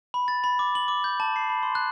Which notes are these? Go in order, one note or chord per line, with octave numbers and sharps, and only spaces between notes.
B5
A6
B5
D6
F#7
D6
G6
A5
C7
B5
C6
F#6